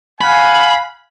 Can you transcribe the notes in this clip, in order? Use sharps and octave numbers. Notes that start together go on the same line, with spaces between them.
F5 F#5 G#5 B5